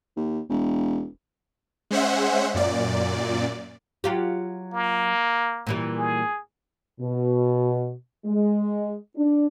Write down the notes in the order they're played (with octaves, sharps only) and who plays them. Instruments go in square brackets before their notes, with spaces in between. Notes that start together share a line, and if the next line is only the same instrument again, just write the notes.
[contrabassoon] D#2
E1
[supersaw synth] G#3 C#4 C5 E5 F#5
F#2 A#2 D5
[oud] F#3 F4 G4
[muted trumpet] A#3
[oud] A#2 E3 G3
[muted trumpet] G#4
[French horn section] B2
G#3
D4